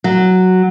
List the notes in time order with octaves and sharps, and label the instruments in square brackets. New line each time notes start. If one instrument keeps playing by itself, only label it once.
[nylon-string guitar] F#3